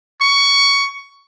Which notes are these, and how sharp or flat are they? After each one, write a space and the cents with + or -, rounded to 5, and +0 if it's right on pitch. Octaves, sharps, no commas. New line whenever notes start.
C#6 +15